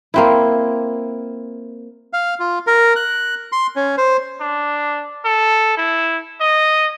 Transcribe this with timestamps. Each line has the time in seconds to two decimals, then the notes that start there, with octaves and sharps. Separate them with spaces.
0.14 A#3 C4 E4
2.13 F5
2.40 F4
2.67 A#4
2.96 F#6
3.52 C6
3.76 C#4
3.98 C5
4.40 D4
5.25 A4
5.77 E4
6.41 D#5